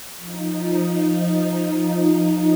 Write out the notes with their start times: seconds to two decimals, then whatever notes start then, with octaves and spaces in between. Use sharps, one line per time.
0.18 F3 D#4